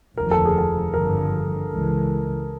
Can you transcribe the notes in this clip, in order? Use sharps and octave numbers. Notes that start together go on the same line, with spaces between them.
F1 D#2 D3 F3 A#4
A4
G#4
A4
G#1 G2 D3 F3 A#4
C#2 C#3 E3 G#3